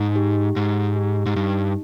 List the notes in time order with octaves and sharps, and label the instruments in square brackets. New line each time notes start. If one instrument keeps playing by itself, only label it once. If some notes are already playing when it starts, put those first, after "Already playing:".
Already playing: [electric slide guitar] G#2 [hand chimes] D#4
[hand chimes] G4
[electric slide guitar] G#2 [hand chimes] D#4
[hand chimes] G4
[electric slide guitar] G#2
[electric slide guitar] G2 [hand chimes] D#4